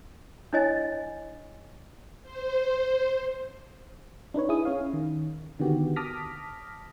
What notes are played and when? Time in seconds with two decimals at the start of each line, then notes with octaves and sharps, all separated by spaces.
0.53 D4 E4 C#5 D#5 G#5 A6
2.23 C5
4.34 D4 D#4 B4 C#5
4.49 E4 G#4 D#6
4.65 C#4 C#5 F5
4.93 D#3
5.59 D3 D#3 B3 F#4 G4
5.96 A5 D6 D#6 F6 A#6 B6